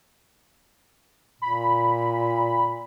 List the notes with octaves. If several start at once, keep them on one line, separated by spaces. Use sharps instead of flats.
A#2 B5